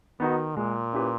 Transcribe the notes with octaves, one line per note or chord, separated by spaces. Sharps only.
D#3 B3 D#4 F#4
A#2 G#3
C#4 E4 G4 B4